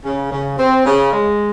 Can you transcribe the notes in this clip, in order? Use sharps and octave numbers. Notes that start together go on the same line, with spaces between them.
C#3
C#3
C4
C#3
G#3